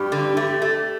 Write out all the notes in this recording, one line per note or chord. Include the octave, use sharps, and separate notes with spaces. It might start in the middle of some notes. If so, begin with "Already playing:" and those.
Already playing: G2 G4
D3
A3
A3